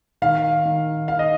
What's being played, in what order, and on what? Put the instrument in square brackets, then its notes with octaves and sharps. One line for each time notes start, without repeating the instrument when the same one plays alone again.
[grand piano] D#3 F5
D#3
D#3 F5
D#5